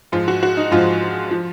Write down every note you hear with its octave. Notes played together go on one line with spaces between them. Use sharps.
G#2 F3 F4
F#4
F#4
D#4
G#2 F3 F4
F3